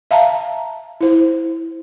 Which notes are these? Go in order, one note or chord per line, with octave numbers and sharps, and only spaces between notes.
E5 F5 A5 A#5
E4 C5